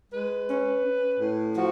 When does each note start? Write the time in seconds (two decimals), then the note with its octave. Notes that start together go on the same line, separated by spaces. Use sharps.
0.12 G#3 B4
0.49 C#4
0.84 C#4
1.20 A2
1.56 F3 F#4